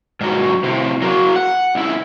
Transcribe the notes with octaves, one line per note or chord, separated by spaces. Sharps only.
G#2 F#3
A2 C3
F#3 A#3
F#5
C#2 E4